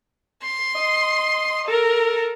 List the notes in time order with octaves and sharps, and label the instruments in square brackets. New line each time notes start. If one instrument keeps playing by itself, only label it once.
[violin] C6
[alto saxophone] D#5
[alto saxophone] A4 [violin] A#4